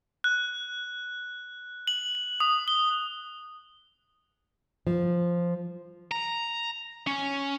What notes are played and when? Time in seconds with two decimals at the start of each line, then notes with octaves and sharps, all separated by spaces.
0.24 F#6
1.88 F#7
2.15 F#7
2.40 D#6
2.68 G7
4.87 F3
6.12 A#5
7.07 C#4